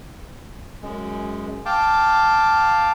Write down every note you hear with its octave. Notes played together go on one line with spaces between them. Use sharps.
F#2 G#3
F5 G5 A5 D6